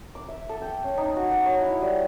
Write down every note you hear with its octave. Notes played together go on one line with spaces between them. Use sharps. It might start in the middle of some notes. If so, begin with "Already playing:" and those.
D6
E5
A4
G5
C#4
D#4
F#4
F#5
C#5
E4
G3